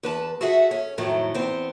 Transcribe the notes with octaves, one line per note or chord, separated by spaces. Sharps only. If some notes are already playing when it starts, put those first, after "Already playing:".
E2 B4 A5
F#4 G#4 A4 E5 F#5
C#4
F2 A2 D#3 F#3 A3
E2 B3 C4